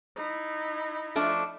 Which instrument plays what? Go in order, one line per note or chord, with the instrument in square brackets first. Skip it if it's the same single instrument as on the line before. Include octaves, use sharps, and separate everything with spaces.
[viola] D#4 E4
[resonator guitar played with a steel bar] F3 A3 D4